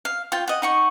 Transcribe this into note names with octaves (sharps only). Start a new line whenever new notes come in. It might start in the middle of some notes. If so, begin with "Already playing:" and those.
F5
F4 G5
D#5 F#5
D#4 F#5 C#6